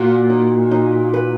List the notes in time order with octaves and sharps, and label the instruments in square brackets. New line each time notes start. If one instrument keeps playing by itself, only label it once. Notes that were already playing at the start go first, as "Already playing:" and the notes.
Already playing: [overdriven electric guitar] A#2 [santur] F#4
[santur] D#4
D#4
B4